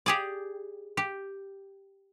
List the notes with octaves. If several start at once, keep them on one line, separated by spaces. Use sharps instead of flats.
G4 G#4 D5
G4